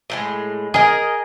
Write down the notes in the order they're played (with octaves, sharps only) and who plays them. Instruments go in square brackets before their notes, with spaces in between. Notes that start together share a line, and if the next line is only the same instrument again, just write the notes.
[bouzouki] A2 F3 G#3
[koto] G#4 [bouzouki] A#4 D#5